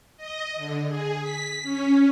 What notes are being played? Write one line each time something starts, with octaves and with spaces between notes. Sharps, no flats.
D#5
D3
G#4
B6
C#4